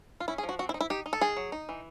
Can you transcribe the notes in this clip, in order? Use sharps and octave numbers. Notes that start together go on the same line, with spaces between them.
F4
C#4 E4
G#4
F3
F#4
C4 F#4
E4
D#4
E4
D#4 G4
D#4
A4
D#3 G#4
F#3
D#4
E3